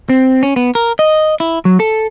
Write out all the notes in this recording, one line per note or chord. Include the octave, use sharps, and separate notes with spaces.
C4
C#4
B3
A#4
D#5
E4
F#3
A4